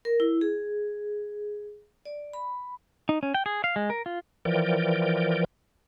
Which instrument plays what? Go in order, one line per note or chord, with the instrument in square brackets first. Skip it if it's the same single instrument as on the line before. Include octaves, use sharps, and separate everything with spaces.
[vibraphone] A#4
E4
G#4
D5
B5
[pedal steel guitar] D#4
C#4
G5
G#4
F5
G#3
A#4
F4
[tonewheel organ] E3 F3 A#4 D5 G5